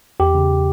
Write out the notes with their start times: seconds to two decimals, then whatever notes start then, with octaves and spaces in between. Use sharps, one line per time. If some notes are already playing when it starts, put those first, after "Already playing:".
0.20 E2 G4
0.35 C#3